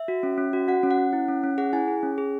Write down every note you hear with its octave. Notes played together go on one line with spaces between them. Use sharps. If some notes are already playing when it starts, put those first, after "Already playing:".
Already playing: E5
F#4
C#4
C#4
F#4
F#4 F#5
C#4
F#5
C#4
E4
C#4
C#4
G#4 F#5
E4 G#5
G#4
C#4
G#4